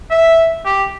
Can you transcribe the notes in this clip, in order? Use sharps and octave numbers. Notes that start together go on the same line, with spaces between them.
E5
G4